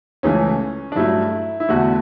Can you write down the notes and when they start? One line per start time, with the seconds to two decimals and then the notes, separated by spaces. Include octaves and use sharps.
0.23 C#2 C#3 E3 A3 C#4
0.92 D4
0.96 G2 F#3 A3 E4
1.60 E4
1.69 E2 D3 A3 F#4